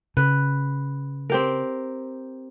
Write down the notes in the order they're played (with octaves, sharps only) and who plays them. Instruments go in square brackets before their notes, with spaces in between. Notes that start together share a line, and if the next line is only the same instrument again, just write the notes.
[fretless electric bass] C#3 [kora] B4
[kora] C4 G4 A#4